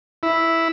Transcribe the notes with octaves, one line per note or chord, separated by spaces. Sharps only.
E4